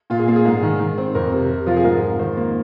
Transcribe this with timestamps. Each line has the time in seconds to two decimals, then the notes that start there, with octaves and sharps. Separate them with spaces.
0.10 A#2 F4
0.19 G#4
0.28 A#3 F4
0.36 G#4
0.45 G#2
0.63 D#3
0.79 D#3
0.98 C4
1.15 F2 A#4
1.32 C3
1.49 C3
1.66 F3 F4
1.77 G#4
1.84 G#2 A#4
2.01 F3
2.19 D#3 C5
2.37 A#3